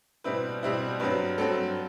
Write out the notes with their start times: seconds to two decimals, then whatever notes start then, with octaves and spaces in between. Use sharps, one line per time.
0.24 B2 G3 C4 E4 B4
0.63 B2 G3 C4 E4
1.00 G2 F#3 C4 B4
1.38 G2 F#3 C4 A4